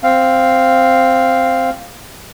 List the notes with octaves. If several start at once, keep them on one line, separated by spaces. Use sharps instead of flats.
C4 F5